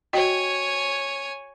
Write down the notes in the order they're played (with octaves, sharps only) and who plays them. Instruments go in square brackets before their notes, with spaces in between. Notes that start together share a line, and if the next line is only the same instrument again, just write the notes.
[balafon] F#4 D#5 G5 [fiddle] C#5 G#5